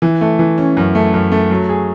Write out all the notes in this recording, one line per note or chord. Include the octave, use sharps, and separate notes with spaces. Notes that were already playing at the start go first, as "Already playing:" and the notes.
E3
A3
E3
C#4
F#2
A3
F#2
A3
F#3
G#4